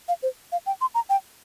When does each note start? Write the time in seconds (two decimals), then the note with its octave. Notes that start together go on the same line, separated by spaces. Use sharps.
0.08 F5
0.23 C5
0.52 F5
0.66 G5
0.81 C6
0.95 A#5
1.10 G5